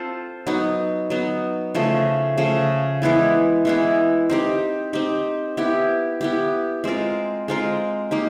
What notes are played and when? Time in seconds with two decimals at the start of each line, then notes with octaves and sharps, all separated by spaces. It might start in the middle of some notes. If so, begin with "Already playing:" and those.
Already playing: C4 F4 A4 C5
0.47 F#3 B3 D#4
1.10 F#3 B3 D#4
1.75 C#3 F3 A3
2.38 C#3 F3 A3
3.02 E3 G#3 B3 E4
3.65 E3 G#3 B3 E4
4.30 C4 D#4 G4
4.93 C4 D#4 G4
5.57 B3 E4 G4
6.21 B3 E4 G4
6.84 G#3 C4 F4 A#4
7.48 G#3 C4 F4 A#4
8.11 A#3 D#4 G4